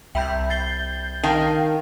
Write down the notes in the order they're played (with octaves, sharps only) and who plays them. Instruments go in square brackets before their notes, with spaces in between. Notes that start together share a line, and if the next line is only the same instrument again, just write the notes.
[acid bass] C2 [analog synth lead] E5 [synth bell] G5 B5 G6
[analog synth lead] G6 [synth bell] A6 C7 G7
[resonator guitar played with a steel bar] D#3 [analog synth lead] F5 [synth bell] G5 A5